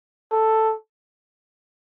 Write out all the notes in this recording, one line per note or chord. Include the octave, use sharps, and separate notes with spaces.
A4